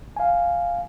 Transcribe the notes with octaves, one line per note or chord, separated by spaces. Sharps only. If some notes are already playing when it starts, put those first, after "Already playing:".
F5 G#5